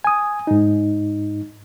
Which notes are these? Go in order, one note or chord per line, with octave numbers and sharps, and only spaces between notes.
G#5 D#6
G#2 D#4